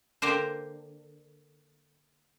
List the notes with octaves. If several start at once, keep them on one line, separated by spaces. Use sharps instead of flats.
D3 A#3 G4 A#4 C5